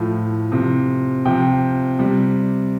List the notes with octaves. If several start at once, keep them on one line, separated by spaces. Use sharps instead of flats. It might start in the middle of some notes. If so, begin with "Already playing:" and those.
Already playing: A2 F3
C3 F3
C3 F3 G5
C3 G3